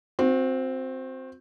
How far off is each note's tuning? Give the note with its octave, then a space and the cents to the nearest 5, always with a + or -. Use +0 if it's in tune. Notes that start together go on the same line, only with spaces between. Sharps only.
C4 +0 F#4 -40